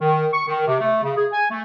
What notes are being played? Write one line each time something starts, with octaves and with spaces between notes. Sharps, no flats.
D#3
C#6
D#3
C3
A3
C#3
G#4
G#5
A3